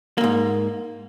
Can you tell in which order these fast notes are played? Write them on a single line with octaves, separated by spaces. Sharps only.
A#3 E2 G#2